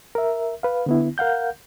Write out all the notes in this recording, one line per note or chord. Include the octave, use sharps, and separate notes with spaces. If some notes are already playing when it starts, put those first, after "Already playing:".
A#4 E5
B4 F5
D3 B3 E4
A#4 F5 F#5 G6